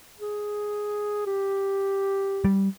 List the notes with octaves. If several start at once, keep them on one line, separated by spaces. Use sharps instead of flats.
G#4
G4
G3